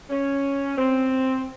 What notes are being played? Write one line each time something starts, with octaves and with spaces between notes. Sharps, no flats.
C#4
C4